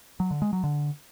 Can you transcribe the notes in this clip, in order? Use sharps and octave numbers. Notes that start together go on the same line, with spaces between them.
F#3
D3
G#3
F#3
D3